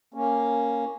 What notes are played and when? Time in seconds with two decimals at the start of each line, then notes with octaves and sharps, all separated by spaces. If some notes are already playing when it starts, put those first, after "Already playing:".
0.14 A#3 C#4